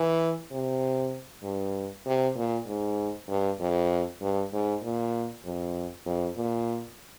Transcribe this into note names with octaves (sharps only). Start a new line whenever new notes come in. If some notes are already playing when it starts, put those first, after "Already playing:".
Already playing: E3
C3
G2
C3
A#2
G#2
G2
F2
G2
G#2
A#2
F2
F2
A#2